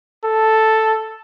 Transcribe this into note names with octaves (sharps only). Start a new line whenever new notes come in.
A4